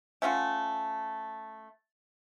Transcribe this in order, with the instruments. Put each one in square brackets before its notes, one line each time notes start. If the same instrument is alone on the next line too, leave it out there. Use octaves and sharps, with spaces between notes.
[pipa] A3 C#4 F4 F#4